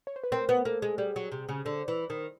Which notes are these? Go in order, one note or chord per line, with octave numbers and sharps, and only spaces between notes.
C#5
C5
B4
C4 A#4
B3
A#3 A4
G#3
G3 G#4
F#3
C3
C#3
D3 C5
E3
D#3